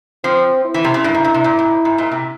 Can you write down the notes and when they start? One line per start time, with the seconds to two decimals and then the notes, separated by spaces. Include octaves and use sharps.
0.24 F3 C4
0.65 E4
0.74 E3
0.84 C3
0.94 C#3
1.04 G2
1.15 G#2
1.25 A#2
1.34 C3
1.44 A#2
1.59 G#2
1.85 G#2
1.98 A#2
2.11 C3